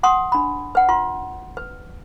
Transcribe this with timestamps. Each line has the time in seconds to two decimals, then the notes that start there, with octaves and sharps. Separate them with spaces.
0.03 F#5 C6 D#6
0.32 D4 B5
0.75 B4 F#5
0.89 F4 C6
1.57 B4